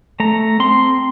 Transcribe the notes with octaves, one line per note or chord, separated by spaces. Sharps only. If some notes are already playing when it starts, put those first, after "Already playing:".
A3 A#5
C4 C6